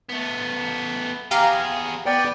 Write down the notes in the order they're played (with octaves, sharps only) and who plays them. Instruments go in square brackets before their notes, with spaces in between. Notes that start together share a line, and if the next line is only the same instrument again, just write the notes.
[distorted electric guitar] A3 B3
[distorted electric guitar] B3 G#4 [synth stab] G4 F5 A#5
[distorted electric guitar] B3 [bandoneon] D5 G5